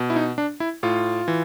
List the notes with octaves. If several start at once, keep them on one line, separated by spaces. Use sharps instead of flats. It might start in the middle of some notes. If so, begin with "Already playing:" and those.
Already playing: B2
E4
D#4
D4
E4
A2 F4
E3